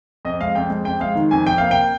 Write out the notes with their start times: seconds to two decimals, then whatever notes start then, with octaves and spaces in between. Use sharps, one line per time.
0.25 F2 D#5
0.40 G#3 F5
0.55 F2 G5
0.70 G#3
0.85 F2 G5
1.00 G#3 F5
1.15 D#3
1.31 F2 G#5
1.46 F2 G5
1.58 A#3 F5
1.71 G5